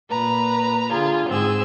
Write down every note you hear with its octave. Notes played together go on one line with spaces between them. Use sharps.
A#2 B4 A#5
D3 F4 G#4
G#2 C4 G#4 E6